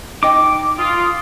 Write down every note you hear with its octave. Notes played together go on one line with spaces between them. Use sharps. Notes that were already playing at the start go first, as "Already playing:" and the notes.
D#4 D#5 G5 D6
F4 D#6